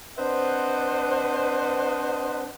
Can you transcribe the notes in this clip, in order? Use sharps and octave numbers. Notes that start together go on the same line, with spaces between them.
C4 D4 B4 C5 D#5 F#5